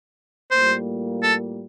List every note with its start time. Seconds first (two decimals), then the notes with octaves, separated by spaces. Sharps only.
0.51 A2 G3 A#3 F4 C5
1.23 A4